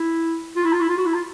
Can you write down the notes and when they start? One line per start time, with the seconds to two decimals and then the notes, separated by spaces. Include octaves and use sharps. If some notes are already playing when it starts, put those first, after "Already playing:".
Already playing: E4
0.56 F4
0.64 E4
0.73 F4
0.81 E4
0.89 F4
0.98 F#4
1.06 E4
1.14 F4